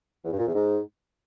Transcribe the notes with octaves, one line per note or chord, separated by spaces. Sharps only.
E2
G2
A#2
E2
G#2